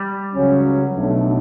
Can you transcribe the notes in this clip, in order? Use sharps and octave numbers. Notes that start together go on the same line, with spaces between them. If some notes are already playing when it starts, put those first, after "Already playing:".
Already playing: G3
C#2 C#3 F#3 C#4
B1 B2 F#3 A3 D4